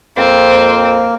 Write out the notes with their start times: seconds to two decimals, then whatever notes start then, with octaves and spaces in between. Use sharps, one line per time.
0.17 F2 A#3 C4